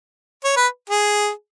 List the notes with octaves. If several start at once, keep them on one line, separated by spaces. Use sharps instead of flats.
C#5
B4
G#4